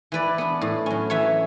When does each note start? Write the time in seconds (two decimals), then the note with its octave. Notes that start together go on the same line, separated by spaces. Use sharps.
0.12 E3 B4 D5
0.38 B3 D4
0.61 A2
0.86 F#3 C#4
1.10 E3 C#5 E5